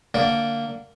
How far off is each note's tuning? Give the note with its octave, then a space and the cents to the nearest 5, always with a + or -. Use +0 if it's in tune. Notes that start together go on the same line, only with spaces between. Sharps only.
D3 -5 A#3 -15 D5 +0